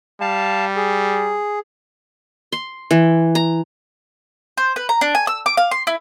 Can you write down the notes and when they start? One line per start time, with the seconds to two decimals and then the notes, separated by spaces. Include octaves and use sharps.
0.21 G3 F5 A5
0.76 G#4
2.52 C6
2.91 E3
3.35 A#5
4.57 C5
4.76 B4
4.89 A#5
5.01 D4
5.15 G#5
5.27 E6
5.46 D6
5.57 F5
5.71 C6
5.87 E4